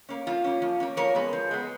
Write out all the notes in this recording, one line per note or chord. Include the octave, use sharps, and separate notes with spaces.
A#3 C#4
F3 F4
A#3 C#4
F3
A#3 C#4
F3 A#4 C#5
G#3 B3
F3
G#3 B3